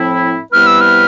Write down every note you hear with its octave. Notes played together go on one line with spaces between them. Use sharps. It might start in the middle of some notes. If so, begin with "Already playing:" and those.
Already playing: A2 F3 C4 E4
C3 G3 B3 E4 B4 F6
E6
F6